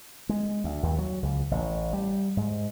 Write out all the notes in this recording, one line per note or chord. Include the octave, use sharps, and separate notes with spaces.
G#3
D2
D#2
F#3
C#2
A1
G3
G#2